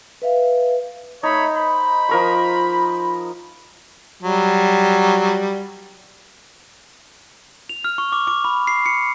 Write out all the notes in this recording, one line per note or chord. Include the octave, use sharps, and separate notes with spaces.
B4 E5 F5
A3 D#4 C#5 B5
C5 B5
F3 A#4 C#6
F#3 G3
F7
F6
C#6
D6
D6
B5
C7
C#7